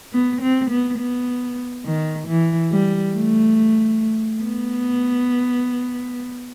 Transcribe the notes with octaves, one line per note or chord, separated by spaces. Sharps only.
B3
C4
B3
B3
D#3
E3
G3
A3
B3